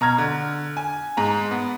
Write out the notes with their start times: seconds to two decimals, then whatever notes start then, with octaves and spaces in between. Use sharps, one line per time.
0.01 B2 A#5 F6 G#6
0.18 D3
0.77 G#5
1.17 G#2 A#5
1.51 B3